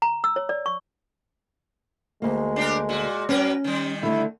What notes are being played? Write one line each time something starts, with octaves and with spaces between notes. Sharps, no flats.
A#5
E6
C#5
D5
C#6
D2 G#3 A#3
D4 G4 A#4
A#2 F#4
F#3 C#4 A#4 B4
D#3 G3
D3 A3 E4